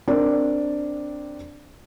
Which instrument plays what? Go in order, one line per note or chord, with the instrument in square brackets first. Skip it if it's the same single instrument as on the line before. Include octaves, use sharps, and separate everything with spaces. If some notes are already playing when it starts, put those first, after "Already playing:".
[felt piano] C4 D4 A#4 D5